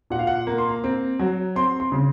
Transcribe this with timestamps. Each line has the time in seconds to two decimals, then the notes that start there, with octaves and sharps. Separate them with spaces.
0.10 A#2 F#5
0.19 F5
0.27 F#5
0.47 A#3 A#5
0.58 C6
0.69 A#5
0.84 C4
1.19 F#3
1.56 C4 C6
1.80 C6
1.92 C#3